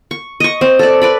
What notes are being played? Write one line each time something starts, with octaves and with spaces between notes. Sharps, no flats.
C#6
D#5 C#6
C4
A4 D5
B4 D5 B5